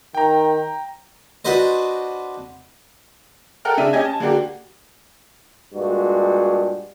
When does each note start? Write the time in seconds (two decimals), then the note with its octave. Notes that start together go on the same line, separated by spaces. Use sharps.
0.15 D#3 G5 A#5
1.45 D4 F#4 B4 C5 D#5
3.65 A4 A#4 F#5 G5 F6
3.77 C#3 D4 E5 D#7
3.93 C#4 G4 D#5 G#5 G#6
4.05 A5
4.20 D3 A#3 D4 F#4 G4
5.73 G2 A#2 G#3 F#4